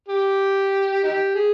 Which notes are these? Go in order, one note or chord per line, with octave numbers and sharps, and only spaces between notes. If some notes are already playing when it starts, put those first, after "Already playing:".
G4
D#4 G4
G#4